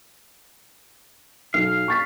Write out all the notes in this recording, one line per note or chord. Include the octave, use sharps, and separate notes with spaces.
B1 F5
C#6 A6 B6